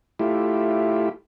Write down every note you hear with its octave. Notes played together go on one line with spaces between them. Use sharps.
A3 E4 F4 G4